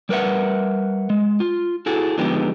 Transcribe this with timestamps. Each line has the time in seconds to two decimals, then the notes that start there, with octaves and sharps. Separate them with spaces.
0.09 G3 A#4 B4 E5 F#5
1.10 G#3
1.40 F4
1.86 E4 F#4 G#4 A4
2.18 D3 F3 G#3 B3 D#4 G4